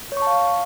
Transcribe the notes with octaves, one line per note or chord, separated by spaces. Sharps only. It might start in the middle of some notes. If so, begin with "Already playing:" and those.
C#5 F5 A5 C#6